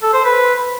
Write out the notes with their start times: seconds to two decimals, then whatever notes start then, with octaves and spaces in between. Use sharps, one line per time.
0.02 A4
0.14 C5
0.25 B4